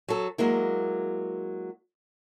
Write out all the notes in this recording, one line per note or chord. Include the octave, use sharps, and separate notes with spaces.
F#3 A4
F#3 G#3 A#3 E4